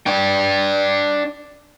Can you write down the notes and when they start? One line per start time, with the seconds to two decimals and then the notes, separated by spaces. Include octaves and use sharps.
0.06 D4 G5